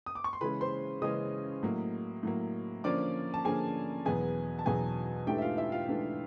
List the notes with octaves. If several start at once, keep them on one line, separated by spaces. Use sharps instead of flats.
D#6
D6
C#6
C6
C#3 E3 G#3 C#4 B4 B5
C5 C6
C#3 E3 G#3 C#4 D#5 D#6
A2 F#3 A#3
A2 F#3 A#3
D3 F3 A#3 C#4 D5 D6
A5
D3 F3 A#3 C#4 G#4 G#5
E2 B2 F#3 B3 G#4 G#5
A5
E2 B2 F#3 B3 G#4 G#5
G#2 E3 A3 D4 G4 G5
E5
F4 F5
E4 E5
F4 F5
G#2 E3 A3 D4